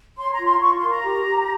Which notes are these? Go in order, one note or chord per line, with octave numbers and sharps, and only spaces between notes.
C#5 C6
A#5
F4
C6
F4 C#6
A#4 C6
A#5
G4
G4